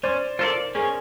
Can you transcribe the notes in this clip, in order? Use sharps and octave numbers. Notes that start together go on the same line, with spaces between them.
C#4 C5 D5
F4 A4 A#4 C5 D5
C#4 G#4 A#4